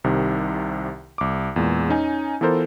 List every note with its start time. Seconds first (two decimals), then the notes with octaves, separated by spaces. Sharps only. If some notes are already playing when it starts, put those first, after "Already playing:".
0.04 C2 C3 D#3
1.18 C2 D6
1.56 E2 A#2 G#3
1.89 C#4 D#4 G#5
2.41 E3 B3 F4 A4 A#4 C5